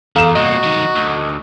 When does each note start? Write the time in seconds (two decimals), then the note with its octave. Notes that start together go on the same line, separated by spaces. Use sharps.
0.16 E2 A4 F5 A#5 E7
0.35 C2 A#2 F#4 D#5
0.63 D#3 F#3
0.96 D2